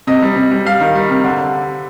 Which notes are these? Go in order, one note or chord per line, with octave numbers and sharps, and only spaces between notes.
C3 D#5
G3
C3
G3
G3 F5
D#3
G3
C3
D3